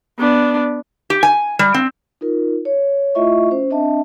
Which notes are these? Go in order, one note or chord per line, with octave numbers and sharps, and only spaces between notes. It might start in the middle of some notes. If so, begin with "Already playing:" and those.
B3 D4
G4
G#5
G3
C4
D#4 F4 A#4
C#5
A3 E4 F4 D#5 E5 C#6
C#4 C5
C4 D4 D#5 E5 A5